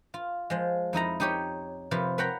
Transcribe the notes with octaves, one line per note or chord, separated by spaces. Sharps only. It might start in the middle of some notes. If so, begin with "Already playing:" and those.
F4
F3 G#3
F2 D#4 E4 A#5
D#4 G4 C#5
C3 F3 F4 B4
B4 C#5 F#5 G5 A#5 B5